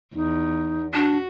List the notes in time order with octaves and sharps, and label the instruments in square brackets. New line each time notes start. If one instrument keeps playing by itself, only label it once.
[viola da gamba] E2 [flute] D#4
[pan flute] D4 [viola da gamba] F#4